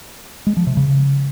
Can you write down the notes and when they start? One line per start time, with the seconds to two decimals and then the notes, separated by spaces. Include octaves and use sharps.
0.47 G#3
0.57 F3
0.67 C3
0.77 C#3